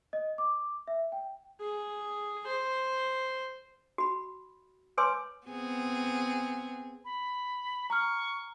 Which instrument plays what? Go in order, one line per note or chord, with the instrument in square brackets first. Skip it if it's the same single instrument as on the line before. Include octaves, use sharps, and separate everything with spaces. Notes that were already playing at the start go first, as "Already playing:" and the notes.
[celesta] D#5
D6
E5
G5
[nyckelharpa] G#4
C5
[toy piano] F#4 B5
B4 C#5 G#5 C6 D6 E6
[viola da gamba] B3 C4 G#4
[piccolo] B5
[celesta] A#5 F6 [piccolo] C#6